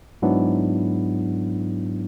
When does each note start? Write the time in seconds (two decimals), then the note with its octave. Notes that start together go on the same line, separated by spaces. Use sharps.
0.22 G#2 F#3 B3 D4 E4